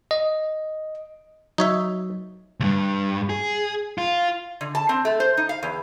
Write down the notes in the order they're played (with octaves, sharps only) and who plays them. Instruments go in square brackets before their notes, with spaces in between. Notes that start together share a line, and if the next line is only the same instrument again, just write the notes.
[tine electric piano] D#5
[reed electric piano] F#3 [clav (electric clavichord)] D#4 C#5 E5
[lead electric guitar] D2 G2
G#4
F4
[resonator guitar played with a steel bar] D3
A5
C4
A3
C5
D#4
F5
E2